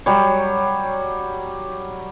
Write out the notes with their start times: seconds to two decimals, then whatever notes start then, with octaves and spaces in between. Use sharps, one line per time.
0.06 F#3 G3 C#5